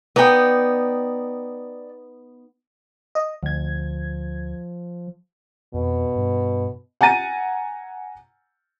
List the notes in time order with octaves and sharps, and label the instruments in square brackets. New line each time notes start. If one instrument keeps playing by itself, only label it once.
[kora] B3 D#4 [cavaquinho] D5 G5
[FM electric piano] D#5
[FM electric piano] D2 G#6 [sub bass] F3
[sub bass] F2 [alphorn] B2
[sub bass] G2
[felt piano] F#5 G#5 A#5 A6 D#7